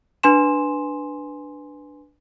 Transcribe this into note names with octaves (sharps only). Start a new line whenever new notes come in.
D4 B4 G#5 C6 E7